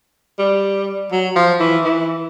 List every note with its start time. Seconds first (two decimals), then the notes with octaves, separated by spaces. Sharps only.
0.39 G3
1.12 F#3
1.36 F3
1.60 E3
1.85 E3